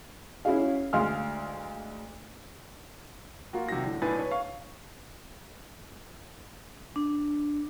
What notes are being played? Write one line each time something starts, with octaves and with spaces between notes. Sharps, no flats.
C#4 E4 F#4 G#4 F5
D2 G#3 F5 C6 F6
A#3 F4 F#4
C3 D#3 G3 F#4 A#6
A2 D3
B1 A2 D4 B4 G#5 A6
B4 C#5
F5 C#6
D4